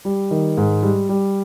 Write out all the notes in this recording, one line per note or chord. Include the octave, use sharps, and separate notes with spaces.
G3
D#3
G#2
G3
G3